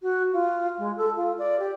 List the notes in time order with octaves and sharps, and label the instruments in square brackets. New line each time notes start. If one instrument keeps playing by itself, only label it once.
[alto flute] F#4
F4
G#3
A4
F4
D5
G4